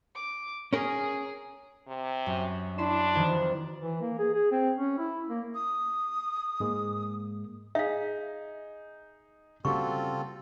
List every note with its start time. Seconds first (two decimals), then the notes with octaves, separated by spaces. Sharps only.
0.15 D6
0.73 C#4 G#4 A#4
1.88 C3
2.26 F#2
2.78 D4 E4 C6 E7
3.15 F2 D#3 E3
3.81 E3
4.01 A#3
4.19 G#4
4.34 G#4
4.52 C4
4.76 C#4
4.98 E4
5.29 A#3
5.55 D#6
6.60 G#2 G#3 A#3
7.75 D#4 G#4 E5 F5
9.65 C#3 G3 A#3 C4 F4 F#4 A4 C#6